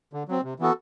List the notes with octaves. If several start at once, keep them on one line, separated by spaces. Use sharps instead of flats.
D3
F#3 C4
C3
E3 B3 F#4 A4